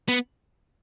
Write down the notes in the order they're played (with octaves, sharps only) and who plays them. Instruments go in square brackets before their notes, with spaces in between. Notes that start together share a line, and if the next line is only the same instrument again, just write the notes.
[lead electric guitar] B3